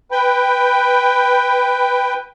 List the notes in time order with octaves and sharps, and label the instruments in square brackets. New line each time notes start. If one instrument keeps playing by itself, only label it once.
[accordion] B4 G5